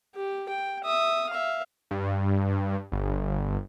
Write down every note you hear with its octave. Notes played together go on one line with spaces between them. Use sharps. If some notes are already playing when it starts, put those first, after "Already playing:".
G4
G5
E5 D#6
E5 F5
G2
G1